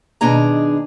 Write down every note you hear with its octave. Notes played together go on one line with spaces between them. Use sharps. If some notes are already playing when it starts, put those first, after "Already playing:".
B2 D#3 D4 G#4 A#5